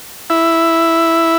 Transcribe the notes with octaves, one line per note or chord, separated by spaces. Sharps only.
E4